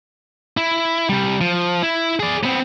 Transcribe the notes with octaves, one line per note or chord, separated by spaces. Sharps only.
E4
C3 G3
F3
E4
G#4 D5
B3 C4